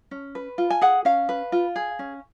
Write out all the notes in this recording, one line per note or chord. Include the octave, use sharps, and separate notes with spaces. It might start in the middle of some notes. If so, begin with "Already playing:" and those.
C#4
B4
F4
G#5
G#4 F#5
C#4 F5
B4
F4
G#4
C#4